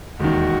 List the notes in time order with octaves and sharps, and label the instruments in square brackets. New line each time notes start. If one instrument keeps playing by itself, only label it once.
[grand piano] E1 D#2 D#3 [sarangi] F#4